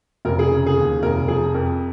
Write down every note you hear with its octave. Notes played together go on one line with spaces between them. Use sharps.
F1 A#4
G#4
C#3
G#4
D#2
F1 A#4
F3 G#4
F2 A#4